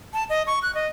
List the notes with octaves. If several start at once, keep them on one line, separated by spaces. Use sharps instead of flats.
A5
D#5
C#6
F#6
D#5